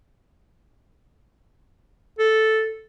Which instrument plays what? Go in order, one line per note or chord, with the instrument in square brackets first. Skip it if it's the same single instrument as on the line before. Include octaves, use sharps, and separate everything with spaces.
[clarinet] A4